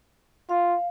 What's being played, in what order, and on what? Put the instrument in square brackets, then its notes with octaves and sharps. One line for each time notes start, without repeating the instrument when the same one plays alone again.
[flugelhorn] F4 [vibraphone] F5